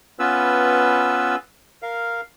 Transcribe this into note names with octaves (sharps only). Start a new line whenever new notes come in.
B3 C#4 F4 B4 E6
A#4 F5